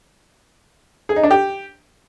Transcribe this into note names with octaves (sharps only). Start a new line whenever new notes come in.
G#4
D#4
D4
G4